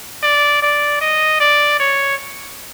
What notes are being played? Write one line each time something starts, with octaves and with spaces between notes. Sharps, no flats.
D5
D5
D#5
D5
C#5